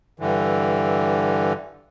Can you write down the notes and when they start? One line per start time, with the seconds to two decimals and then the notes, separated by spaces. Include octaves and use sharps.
0.20 G2 D3 E3